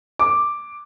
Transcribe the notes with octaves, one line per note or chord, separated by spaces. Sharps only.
D6